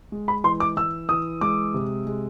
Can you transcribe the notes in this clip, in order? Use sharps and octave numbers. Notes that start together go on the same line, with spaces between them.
G#3
B5
E3 C6
D6
E3 E6
E3 D#6
G#3 D6
C3
G#3